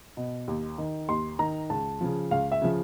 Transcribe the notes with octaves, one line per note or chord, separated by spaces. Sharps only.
B2
D#2
D#3
D#2 C6
D#3 A#5
C#2 A5
C#3 F3
C#2 F5
E5
C#3 F3